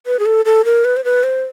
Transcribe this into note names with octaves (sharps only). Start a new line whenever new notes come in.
B4
G#4
A4
A4
A#4
B4
C5
B4
C5